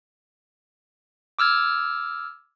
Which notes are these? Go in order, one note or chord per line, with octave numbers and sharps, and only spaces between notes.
D6 E6 F6 G#6